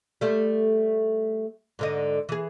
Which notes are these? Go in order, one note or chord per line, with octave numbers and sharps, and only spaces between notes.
G3 A3
G#2 D3 D#5
E3 G#4